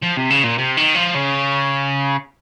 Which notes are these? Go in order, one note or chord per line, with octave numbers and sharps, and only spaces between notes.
F3
C3
C#3
A#2
C3
D#3
F3
C#3